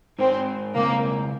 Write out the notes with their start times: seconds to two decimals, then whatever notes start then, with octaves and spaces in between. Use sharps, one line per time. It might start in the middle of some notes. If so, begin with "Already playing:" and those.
0.19 G#3 C4 D#4 A#4
0.75 C#3 G#3 A#3 C4